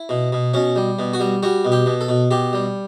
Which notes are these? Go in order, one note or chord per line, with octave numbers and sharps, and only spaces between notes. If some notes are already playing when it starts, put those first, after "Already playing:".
Already playing: E4
B2
B2
B2 C#4
G3
B2
F#4
G3
G3 F#4
B2
G4
B2
A4
B2
B2 G4
G3